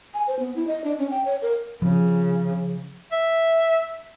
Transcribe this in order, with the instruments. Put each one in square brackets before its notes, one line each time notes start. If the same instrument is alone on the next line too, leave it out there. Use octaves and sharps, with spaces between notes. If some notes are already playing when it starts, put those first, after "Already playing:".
[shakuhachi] G#5
C5
B3
E4
D#5
D4
C#4
G5
C#5
A#4
[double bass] C#3 [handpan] F3
[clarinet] E5